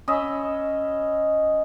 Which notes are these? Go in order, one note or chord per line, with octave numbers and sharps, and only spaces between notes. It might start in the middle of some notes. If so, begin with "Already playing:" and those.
C#4 D#5 E5 B5